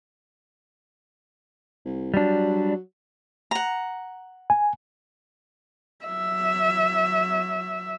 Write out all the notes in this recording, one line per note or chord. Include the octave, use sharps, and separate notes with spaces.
C2
F#3 G3 D4
F#5 A#5
G#5
F#3 E5